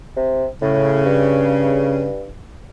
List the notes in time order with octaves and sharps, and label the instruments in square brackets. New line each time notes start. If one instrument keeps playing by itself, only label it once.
[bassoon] C3
[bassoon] A2 [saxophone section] C#3
[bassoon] G2